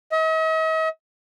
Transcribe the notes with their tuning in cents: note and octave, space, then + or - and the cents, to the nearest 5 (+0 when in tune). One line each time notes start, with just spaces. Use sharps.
D#5 +45